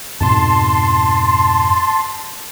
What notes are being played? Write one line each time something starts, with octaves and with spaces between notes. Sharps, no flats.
F2 G#2 B2 A5 C6